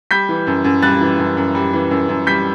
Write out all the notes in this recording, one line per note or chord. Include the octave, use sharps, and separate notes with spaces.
G3 G6 B6
E3
F#2
F#2
G3 F#6 A6
E3
F#2
F#2
G3
E3
F#2
F#2
G3 G6 B6